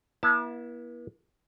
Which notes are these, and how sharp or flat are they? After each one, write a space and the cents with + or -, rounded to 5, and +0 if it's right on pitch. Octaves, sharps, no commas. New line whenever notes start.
B3 -45 E4 +0 A5 +0